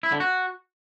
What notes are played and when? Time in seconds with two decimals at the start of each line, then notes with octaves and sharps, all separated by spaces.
0.03 E4
0.12 D3
0.20 F#4